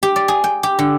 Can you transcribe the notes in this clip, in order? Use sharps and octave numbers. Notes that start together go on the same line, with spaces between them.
G4
D5
G#4
G5
G4
D3